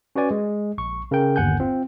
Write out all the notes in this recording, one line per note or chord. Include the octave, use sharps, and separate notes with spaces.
C#4 F#4 B4 D5 G#5
G#3
A#1 C#6
C#3 A#4 G5
G1 D#2 F#5 G#5 G6
C4 F4